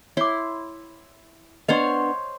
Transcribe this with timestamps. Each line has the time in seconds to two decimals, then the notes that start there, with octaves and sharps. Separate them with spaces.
0.17 E4 C#5 C6 D6
1.69 B3 D4 C5 C#5 D#5 F5 C6